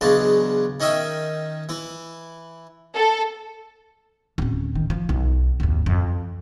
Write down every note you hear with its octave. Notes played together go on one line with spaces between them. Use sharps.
E2 C#3 F#3 G#3 D4 A5
D#3 C#4 D#5 E5 G5
E3 E4
A4
D1 C#4
D#3
F3
B1
G#1 D#2
F2